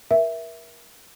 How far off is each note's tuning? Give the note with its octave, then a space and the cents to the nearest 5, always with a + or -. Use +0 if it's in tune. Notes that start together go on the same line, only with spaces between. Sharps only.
A#4 +35 E5 +0